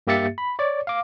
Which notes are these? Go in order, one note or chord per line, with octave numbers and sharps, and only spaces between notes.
G2 A#3 G4 E5 A6 C#7
B5
C#5 D5
F5 D6